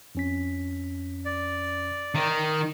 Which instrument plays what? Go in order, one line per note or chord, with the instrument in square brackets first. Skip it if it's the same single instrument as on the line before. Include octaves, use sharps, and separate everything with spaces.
[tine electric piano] F2 C#4 B6
[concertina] D5
[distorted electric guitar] D#3